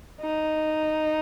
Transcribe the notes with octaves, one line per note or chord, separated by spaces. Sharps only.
D#4